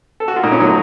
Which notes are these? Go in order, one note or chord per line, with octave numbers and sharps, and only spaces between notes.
A4
F#4
F4
A#2 D#4
C#4
F#3 A3 D#4